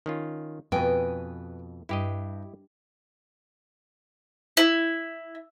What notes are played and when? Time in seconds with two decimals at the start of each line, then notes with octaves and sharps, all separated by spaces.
0.06 D#3 C#4 F4
0.72 F2 B2 B4 G5 G#5
1.89 G2 E4 G4 D#5
4.57 E4